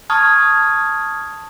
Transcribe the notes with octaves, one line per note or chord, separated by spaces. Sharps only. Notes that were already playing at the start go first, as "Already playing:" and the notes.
A5 C#6 D#6 F6 G#6